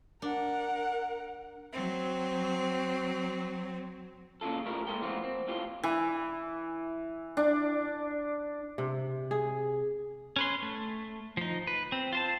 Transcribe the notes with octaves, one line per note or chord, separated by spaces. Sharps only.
D4 A#4 F#5
F#3 C4
A#2 C#3 E3 F4 A4
A3 E4 F4 G4 A#4
A#2 G#3 A4 A#4 G5
E3 F3 A3 B3 C4 F4
C4
A2 E3 F4 G4
E3
D4
C3
G#4
C#4 B4 C6
A3
F3 D#4
B4
C4
F4 C5 A5